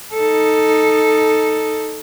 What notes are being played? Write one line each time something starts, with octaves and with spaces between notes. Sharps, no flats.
D#4 A4